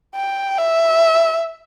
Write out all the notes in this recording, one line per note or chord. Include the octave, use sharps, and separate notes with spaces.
G5
E5